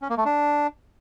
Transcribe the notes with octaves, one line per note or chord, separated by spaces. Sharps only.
C#4
A#3
A3
D4